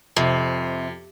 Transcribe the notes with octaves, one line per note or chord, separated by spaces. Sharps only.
F2 C3